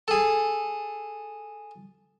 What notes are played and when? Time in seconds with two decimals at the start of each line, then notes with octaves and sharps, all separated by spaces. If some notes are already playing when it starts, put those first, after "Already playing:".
0.08 G#4 A4